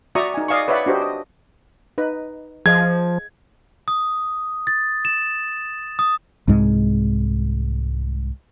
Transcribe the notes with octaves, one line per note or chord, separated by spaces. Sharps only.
F#4 D5 E5 A#5 C#6 D#6
D#4 G#5
D5 D#5 F5 G#5 C#6
B4 C#5 D5 E5 F#5 B5
D4 F#4 G4 C5 D#5
D#5
D#4 B4 D#5
F3 G#4 D#5 F5 G#6
D#6
A6
E7
D#6
C2 G#2 G#3